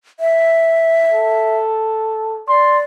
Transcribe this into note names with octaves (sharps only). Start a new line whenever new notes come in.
E5
A4
D5 C6